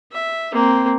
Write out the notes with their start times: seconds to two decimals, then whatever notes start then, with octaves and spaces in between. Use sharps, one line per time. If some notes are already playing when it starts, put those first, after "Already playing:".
0.12 E5
0.52 A#3 C4